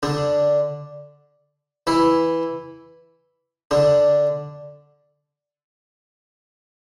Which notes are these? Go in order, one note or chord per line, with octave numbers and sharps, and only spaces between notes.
D3 D4
E3 E4
D3 D4